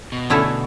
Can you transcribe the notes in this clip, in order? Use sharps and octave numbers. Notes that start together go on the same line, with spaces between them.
B2
D3 A3 C#4 E4 A4